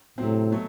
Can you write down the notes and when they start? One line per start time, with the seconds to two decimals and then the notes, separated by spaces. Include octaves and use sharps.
0.18 A2 C3 F#3 C4
0.51 B2 F#3 A3